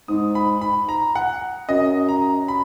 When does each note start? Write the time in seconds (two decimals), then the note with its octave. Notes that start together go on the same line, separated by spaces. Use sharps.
0.08 G#2 D#6
0.35 B5
0.61 B5
0.89 A#5
1.15 F#5
1.69 F#2 D#5
2.09 A#5
2.48 B5